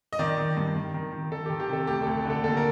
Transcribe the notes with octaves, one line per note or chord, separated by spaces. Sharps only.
D#5
D#3 D5
D#3
G2
D#3
D#3
D#3
D#3 A4
D#3 G4
G4
C3 A4
D2 G4
D2 A4
D3
A4
D#2 A4
A#4